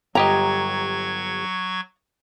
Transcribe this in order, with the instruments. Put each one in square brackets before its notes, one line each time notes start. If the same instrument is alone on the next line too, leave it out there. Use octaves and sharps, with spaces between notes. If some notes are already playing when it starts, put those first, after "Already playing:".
[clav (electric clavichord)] G1 G4 D#5 [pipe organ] F#3 C#6 G#6 [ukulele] A#5